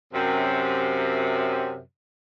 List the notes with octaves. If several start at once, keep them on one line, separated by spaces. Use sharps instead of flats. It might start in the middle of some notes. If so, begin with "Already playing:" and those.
F#2 C3